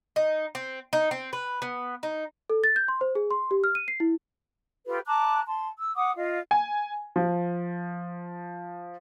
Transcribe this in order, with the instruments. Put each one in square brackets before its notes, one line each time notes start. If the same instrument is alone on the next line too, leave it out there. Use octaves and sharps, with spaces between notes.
[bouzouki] D#4
C4
D#4
C4
B4
B3
D#4
[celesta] A4
A6
G6
C6
C5
G#4
C6
G4
F6
D#7
C7
E4
[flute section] F4 G4 A4 B4
A5 A#5 D6 F#6
A5 C6
E6
F#5 D6 D#6
F4 D#5 F5
[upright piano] G#5
F3